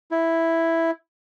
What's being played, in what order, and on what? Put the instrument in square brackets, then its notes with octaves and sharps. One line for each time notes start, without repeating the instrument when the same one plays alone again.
[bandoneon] E4